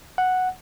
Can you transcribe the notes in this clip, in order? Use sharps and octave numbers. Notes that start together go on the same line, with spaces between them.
F#5